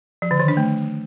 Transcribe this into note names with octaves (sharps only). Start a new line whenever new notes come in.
F3
D3
D#3
D4
A3